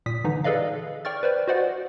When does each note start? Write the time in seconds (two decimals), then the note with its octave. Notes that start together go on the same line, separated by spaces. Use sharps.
0.06 A#2 D#6 B6
0.24 D3 E3 D#4
0.44 G#4 A4 B4 D5 D#5 F5
1.05 D5 G5 C#6 F6 A6
1.23 B4 C5 D5
1.48 F#4 B4 C5 D5 D#5 F#5